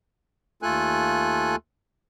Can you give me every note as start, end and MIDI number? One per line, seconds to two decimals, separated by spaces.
0.62 1.56 39
0.62 1.56 57
0.62 1.56 65
0.62 1.56 69
0.62 1.56 80
0.62 1.56 90